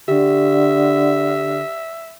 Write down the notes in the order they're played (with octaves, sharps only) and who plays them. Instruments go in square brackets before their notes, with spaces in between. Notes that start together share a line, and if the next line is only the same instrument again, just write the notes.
[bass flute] D3 [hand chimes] G4 [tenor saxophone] E5